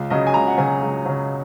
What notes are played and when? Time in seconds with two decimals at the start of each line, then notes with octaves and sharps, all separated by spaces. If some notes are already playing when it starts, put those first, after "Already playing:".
Already playing: C#2
0.10 C#3 F#3 D#5
0.27 G#5
0.34 C#2 A#5
0.48 F#5
0.58 C#3 F#3 G#5
0.82 C#2
1.06 C#3 F#3